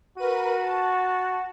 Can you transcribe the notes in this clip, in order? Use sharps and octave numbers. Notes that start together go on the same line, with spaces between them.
F#4 A#4 B4 D#7
A5